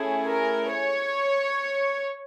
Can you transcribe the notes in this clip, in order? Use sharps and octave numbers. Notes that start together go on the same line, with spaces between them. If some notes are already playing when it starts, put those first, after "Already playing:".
Already playing: A3 C#4 E4 G#4
A#4
C#5